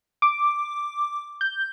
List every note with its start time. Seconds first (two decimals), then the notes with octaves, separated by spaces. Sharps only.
0.22 D6
1.41 G6